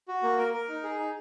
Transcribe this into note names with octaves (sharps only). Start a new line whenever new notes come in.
F#4
A#3
A#4
A#4
D#4
G#4
D#4